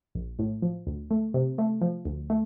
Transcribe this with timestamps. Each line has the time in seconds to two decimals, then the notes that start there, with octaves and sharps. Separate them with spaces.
0.15 A#1
0.39 A2
0.62 F3
0.87 D2
1.11 A3
1.34 C3
1.58 A3
1.81 F3
2.05 D2
2.30 A3